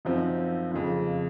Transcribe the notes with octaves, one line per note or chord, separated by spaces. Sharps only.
F#2 F3 C4 D#4
F2 C#3 F3